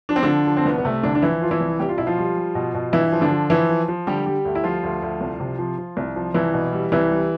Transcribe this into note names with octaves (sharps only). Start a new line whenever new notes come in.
F3 D4
C4
D3 F3 D4
F3
C4
C2 B3
B3
C3 A3
C2 D3 D4
D4
E3 F3 E4
F3 F4
E3 E4
C2
C2 G4
F4
B2 E4
F3 F4
G3
G3
B2
B2
G2 E3 E4
F3
D3 D4
F3
E3 F3 E4
F3
F3
D3 G3 G4
G3
D2
E4
F3 G3 F4
D2
D2
C2
C3
F3
F3
C2
F3
C2 E3 E4
B2
G3
C2 E3 E4
G3